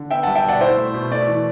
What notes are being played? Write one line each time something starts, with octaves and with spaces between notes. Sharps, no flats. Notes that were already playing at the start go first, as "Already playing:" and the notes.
Already playing: D3
B3 E5 G5
G3 F#5 A5
E5 G5
B2 D5 F#5
E4 C5 E5
A3
B2
A3 D5
E3